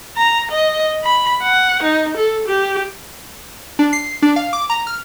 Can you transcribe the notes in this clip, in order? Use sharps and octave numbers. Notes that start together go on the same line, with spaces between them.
A#5
D#5
B5
F#5
D#4
A4
G4
D4
C7
D4
F5
D6
A#5
F6